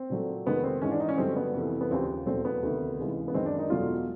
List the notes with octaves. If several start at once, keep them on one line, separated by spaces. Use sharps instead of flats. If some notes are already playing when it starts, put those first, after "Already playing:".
Already playing: C4
A#2 F#3 A3
F2 C3 D#3 G#3 B3
C4
G#2 E3 G#3 C#4
D4
D#4
C#4
G2 D3 F#3 A3 C4
B3
F2 C3 E3 A3
B3
D#2 C#3 F3 C4
E2 B2 F#3 A3 C4
B3
D2 C3 D#3
C#2 C3 E3 G#3
B3
F#2 D#3 G#3 C4
D4
D#4
E2 B2 F#3 A3 F4